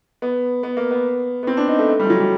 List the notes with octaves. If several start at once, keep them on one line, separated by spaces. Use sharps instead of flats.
B3
B3
A#3
B3
B3
C4
D4
D#4
A3
A3
G3
F3
F#3
G3